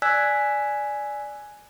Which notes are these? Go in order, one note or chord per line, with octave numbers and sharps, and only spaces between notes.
D5 G#5 E6 F#6 G#6 B6